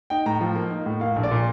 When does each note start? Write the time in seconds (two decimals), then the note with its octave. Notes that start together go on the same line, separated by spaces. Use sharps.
0.10 D#4 G5
0.26 A2 A#5
0.40 F3
0.55 A#3
0.70 D#4
0.86 A2
1.00 A#3 F5
1.16 A#1
1.23 D5
1.31 A#2